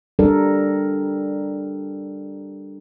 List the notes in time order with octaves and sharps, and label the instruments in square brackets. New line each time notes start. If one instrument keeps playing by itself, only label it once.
[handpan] G3 D4 A4 A#4